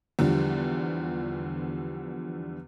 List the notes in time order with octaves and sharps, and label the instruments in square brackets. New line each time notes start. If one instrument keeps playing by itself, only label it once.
[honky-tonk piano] E2 D3 F3 G3